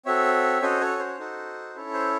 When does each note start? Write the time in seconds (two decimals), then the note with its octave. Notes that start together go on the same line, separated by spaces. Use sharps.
0.05 C4 F#4 A4 C#5 E5
0.61 C#4 F#4 A4 C5 D#5
0.81 A4 C#5
0.99 C5
1.19 D#4 F#4 A4
1.75 C#4 E4 A4
1.94 C5